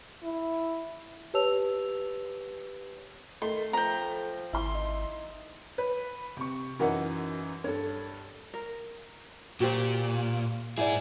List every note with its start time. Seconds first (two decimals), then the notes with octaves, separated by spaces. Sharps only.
0.23 E4
1.34 G4 B4 C#5 A5 E6 F7
3.42 D#3 A3 C6
3.73 F3 G5 A#5
4.53 G#1 E4 C6
4.75 D#4
5.78 B4
6.37 C3 C#6
6.79 F#2 E3 D#4 F#4 A#4 F#5
7.64 G2 A4 C#5
8.54 A#4
9.60 A#2 F#4 G4 C5
10.78 G#2 E4 G#4 D5